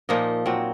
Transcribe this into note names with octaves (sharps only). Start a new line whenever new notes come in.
A#2 F3 A#3 D#4
A#2 F#3 C4